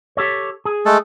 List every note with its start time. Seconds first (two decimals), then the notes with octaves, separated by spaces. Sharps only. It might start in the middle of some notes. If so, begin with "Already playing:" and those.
0.17 G4 A4 C#5
0.65 G#4
0.86 G#3 A3 A4